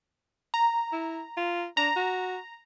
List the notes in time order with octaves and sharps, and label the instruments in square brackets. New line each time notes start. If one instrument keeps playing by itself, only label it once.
[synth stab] A#5
[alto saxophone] E4
F4
[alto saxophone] D4 [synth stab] A#5
[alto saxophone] F#4